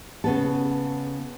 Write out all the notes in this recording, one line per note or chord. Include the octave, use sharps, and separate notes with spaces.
C#3 B3 A4